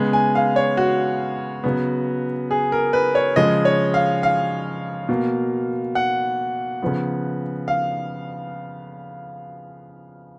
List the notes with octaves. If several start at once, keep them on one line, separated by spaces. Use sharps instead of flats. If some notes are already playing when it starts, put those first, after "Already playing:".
Already playing: C#3 G#3 B3
G#5
F5
C#5
F#4
C#3 F#3 B3
G#4
A#4
B4
C#5
C#3 F3 G#3 D#5
C#5
F5
F5
B2 A#3
F#5
C#3 F3 B3
F5